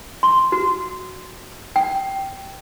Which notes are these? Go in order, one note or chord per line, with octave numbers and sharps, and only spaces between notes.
C6
F#4
G5